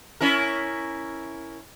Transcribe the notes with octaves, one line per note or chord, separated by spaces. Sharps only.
C#4 E4 A#4